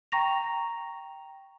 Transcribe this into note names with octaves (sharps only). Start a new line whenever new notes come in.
G5 A#5 C#6 A#6 F7